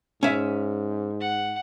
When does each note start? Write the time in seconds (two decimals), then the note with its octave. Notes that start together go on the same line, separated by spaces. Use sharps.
0.23 G#2 C#4 E5
1.20 F#5